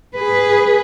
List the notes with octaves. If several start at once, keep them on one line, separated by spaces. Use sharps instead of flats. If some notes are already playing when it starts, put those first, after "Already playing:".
G#4 B4